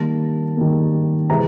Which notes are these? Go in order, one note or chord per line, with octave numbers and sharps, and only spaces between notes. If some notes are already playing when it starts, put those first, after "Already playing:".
Already playing: D#3 G3 A#3 A5
D#3 G3 A#3
C3 E3 G#3 A#5